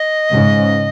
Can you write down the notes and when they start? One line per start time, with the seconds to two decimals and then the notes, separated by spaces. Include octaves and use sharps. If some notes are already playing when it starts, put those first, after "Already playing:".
Already playing: D#5
0.32 G#2 C#3